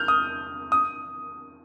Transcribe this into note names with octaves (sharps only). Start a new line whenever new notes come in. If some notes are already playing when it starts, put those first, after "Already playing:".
Already playing: F6 G6
D#6
D#6